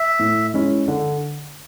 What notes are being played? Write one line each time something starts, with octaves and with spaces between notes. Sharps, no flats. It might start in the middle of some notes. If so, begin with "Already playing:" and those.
Already playing: E5
A2
G#3 C#4 E4
D3